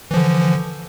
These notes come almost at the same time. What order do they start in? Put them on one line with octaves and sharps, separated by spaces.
E3 F3 D3